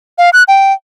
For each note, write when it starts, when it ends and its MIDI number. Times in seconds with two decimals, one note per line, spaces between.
0.18 0.30 77
0.33 0.43 90
0.48 0.73 79